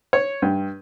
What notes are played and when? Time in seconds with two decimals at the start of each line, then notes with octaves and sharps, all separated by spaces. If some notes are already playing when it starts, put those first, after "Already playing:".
0.13 C#5
0.42 G2